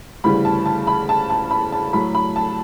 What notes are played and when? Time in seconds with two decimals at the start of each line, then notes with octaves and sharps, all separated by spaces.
0.24 D2 C#3 E3 G3 B5
0.45 A5
0.66 A5
0.87 B5
1.09 A5
1.30 A5
1.51 B5
1.72 A5
1.93 A2 F#3 B5
2.15 B5
2.36 A5